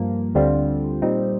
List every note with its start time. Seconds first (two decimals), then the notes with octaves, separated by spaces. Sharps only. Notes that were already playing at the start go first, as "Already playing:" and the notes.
Already playing: G2 F3 A#3
0.35 D2 D3 G3 C4 F4
1.02 A#2 G3 C4 D#4